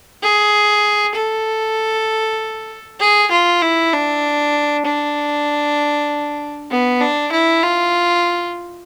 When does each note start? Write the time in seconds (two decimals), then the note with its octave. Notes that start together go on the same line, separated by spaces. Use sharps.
0.22 G#4
1.15 A4
3.00 G#4
3.31 F4
3.62 E4
3.93 D4
4.85 D4
6.70 B3
7.01 D4
7.32 E4
7.63 F4